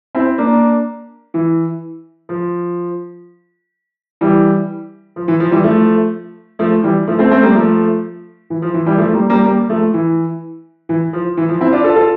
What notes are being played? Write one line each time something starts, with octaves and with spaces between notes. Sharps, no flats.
C4 E4
A#3 D4
E3
F3
E3 G3
F3
E3
F3
E3 G3
F3 A3
F3 A3
E3 G3
F3 A3
A3 C4
A3 C4
G3 A#3
F3 A3
E3
F3
E3
E3 G3
F3 A3
G3 A#3
G3 A#3
G3 A#3
F3 A3
E3
E3
F3
E3
F3
C4 E4
D4 F4
F4 A4
F4 A4